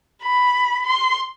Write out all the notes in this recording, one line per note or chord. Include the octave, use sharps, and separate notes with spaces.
B5
C6